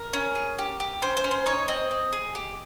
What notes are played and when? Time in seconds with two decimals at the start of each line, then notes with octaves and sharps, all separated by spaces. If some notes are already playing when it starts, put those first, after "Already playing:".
Already playing: A#4
0.13 C#4
0.35 G#4
0.59 G4
0.80 G4
1.02 C#4 C5
1.17 C5
1.24 C#4
1.31 C5
1.46 D#4 C#5
1.68 C4 D#5
1.91 C4
2.13 G#4
2.35 G4